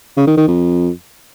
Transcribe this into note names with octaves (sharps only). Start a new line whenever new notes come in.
C#3
D#3
D#3
F2